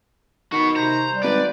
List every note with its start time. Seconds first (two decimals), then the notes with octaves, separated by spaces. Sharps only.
0.52 D#3 F#4 B5 C#6
0.76 C3 C5 A#5
1.09 G3
1.23 G#1 B4 D5